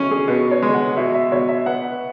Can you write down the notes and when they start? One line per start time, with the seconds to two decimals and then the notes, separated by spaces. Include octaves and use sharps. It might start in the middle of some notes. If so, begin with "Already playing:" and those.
Already playing: B2 C#4
0.11 G#4
0.28 B2 B4
0.51 C#5
0.62 G#3
0.74 F#5
0.97 B2 E5
1.14 E5
1.32 B2 C#5
1.49 E5
1.66 B3 F#5